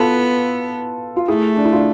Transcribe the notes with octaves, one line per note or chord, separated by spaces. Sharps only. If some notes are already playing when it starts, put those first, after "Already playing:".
Already playing: B3 F4 A4 B4
F4
A3 E4 G#4
D4
E4
D4 F4